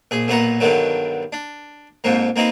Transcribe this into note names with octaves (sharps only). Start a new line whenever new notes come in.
A#1 G#4
B1 A#2 B3 B4 F#5 A#5
G2 B2 D3 D#3 F#3
D4
F2 G#2 F3 A#3
A#3 C4 D#4 G4 B4